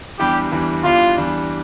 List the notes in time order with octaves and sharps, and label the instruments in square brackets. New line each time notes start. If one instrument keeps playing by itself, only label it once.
[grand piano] E2 E3 G3 D4 [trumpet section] G4
[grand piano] E2 E3 G3 D4
[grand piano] E2 E3 G3 D4 [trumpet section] F4
[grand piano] E2 E3 G3 D4